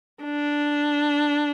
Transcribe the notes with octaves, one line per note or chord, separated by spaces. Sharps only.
D4